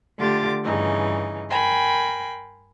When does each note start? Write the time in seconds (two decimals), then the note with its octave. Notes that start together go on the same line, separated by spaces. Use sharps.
0.19 D3 A3 F4 G4 D6 A6
0.64 G2 C#3 E3 D#4
1.50 A#4 G5 G#5 B5 C6